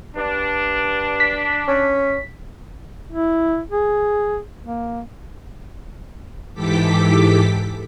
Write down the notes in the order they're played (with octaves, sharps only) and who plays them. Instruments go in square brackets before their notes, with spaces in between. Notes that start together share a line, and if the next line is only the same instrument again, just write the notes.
[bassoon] G2 [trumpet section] D4
[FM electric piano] B6
[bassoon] C#4
[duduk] E4
G#4
A#3
[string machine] G#2 E3 G4 A4 D6 B6